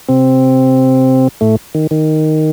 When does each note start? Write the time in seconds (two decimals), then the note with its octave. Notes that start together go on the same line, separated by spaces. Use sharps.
0.08 C3 C4
1.41 A2 A3
1.75 D#3
1.91 D#3